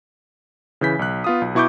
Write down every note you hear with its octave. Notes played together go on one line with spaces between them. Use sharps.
C#3 E3 G6 B6
B1 F#6
B3 F4 D#6
B1
B2 E4 C#6 D6 G6